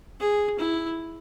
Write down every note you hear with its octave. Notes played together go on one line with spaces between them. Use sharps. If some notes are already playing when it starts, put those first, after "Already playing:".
G#4
E4